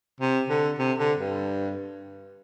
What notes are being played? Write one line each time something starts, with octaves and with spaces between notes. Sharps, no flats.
C3
D3
C3
D3
G2